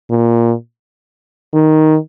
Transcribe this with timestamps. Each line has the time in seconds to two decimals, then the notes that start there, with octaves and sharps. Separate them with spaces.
0.10 A#2
1.53 D#3